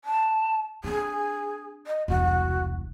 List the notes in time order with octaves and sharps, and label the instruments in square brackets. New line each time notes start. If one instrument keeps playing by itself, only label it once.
[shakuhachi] A5
[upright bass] C4 D4 [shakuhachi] G#4
[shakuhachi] D#5
[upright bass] E1 C2 [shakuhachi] F#4